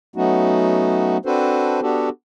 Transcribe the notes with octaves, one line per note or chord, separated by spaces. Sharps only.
F#3 A3 B3 C#4 D#4 F#4
C4 D4 F#4 A4 B4 C5
B3 D4 F#4 G4 A4